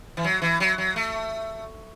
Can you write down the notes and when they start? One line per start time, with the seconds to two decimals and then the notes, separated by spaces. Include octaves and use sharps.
0.17 E3
0.24 F#3
0.42 E3
0.60 F#3
0.78 F#3
0.96 A3